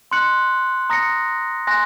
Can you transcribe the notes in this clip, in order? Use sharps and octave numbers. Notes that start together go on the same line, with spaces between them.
C6 F#6 C#7 F#7
A#5 D#6 A#6 C#7
G#5 C6 F#6 A#6